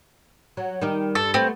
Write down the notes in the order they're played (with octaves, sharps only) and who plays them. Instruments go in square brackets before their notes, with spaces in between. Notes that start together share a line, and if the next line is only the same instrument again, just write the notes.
[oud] F#3
D#3 G3 D#4
[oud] G2 [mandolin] A4
[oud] A3 B3 [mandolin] C4